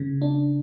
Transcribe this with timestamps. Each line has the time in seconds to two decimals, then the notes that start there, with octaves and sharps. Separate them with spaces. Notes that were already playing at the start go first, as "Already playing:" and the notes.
Already playing: C#3
0.22 D4